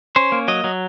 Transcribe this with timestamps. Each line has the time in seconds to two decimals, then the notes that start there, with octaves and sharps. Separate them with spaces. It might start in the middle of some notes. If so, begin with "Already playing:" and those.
0.16 C#4 C5
0.32 A#3
0.48 F#3 D#5
0.64 F#3